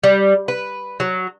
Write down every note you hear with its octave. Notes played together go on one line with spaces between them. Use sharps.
G3
B4
F#3